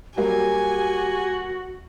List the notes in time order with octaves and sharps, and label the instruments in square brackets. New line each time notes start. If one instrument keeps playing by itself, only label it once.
[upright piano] F#3 G3 A#3 [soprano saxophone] F#4 [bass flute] G4 [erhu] G#5